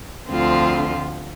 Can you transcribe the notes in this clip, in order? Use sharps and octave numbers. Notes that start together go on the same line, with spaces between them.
D2 D3 F3 C4 F4